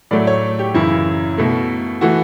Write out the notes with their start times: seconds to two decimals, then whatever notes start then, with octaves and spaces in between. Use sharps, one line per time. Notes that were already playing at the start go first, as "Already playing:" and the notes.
0.11 A2 F#3 A3 D5
0.27 C#5
0.59 G4
0.74 F#2 C#3 E3 E4
1.38 B2 A3
2.01 E3 A3 F#4